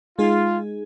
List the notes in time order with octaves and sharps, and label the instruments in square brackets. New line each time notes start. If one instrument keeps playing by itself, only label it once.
[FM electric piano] G#3 D#4 G#4 [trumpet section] F4